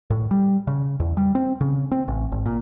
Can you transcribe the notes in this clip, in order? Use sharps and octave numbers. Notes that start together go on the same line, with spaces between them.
A2
G3
C#3
E2
G3
C4
C#3
C4
A1
G#1
A#2